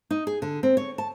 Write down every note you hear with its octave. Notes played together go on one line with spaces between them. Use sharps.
D#4
G#4
D3
C4
C#5
A5